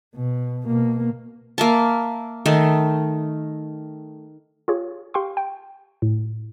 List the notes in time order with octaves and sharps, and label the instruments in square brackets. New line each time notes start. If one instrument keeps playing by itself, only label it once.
[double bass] B2
B2 A#3
[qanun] A#3 E5 A5
D#3 A3 D#4
[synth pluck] F4 G4 G#4 C#5
G4 F5 G5 C6 C#6
G5
A2